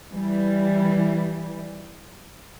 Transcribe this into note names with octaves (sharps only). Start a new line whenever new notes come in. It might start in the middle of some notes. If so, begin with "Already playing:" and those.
E3 G3